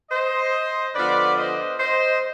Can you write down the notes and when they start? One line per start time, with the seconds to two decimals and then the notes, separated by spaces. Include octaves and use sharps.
0.11 C5 D#5
0.95 D3 F3 B3 B4 D5
1.37 C5 D#5
1.80 C5 D#5